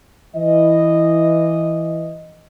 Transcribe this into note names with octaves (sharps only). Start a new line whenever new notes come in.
E3 D#5